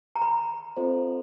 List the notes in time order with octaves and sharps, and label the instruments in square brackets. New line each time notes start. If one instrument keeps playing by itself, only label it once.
[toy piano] A#5
B5
[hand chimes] C4 F4 A4 C5 D#5